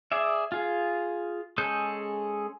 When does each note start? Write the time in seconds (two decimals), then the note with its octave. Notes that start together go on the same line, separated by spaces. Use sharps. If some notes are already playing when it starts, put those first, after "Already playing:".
0.12 G#4 D5 E5
0.52 F4 G#4
1.58 G#3 C#4 G#4 A4 G6